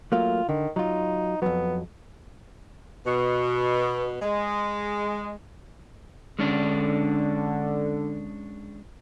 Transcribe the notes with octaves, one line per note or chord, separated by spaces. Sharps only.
F#3 A3 A#3 F4
D3 D#3
F#3 D#4 F4
F2 F#3 B3
B2
G#3
D3 G#3 C#4 D4